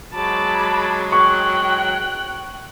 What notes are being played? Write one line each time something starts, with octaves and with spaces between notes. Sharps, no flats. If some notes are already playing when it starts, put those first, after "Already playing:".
F#3 G#3 A5 B5 D6
G5 C#6 F#6